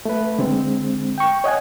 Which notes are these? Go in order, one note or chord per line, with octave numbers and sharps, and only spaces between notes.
A3 B4
D3 G#3 C4
G5 C#6
C#5 D#5 F#5 G#5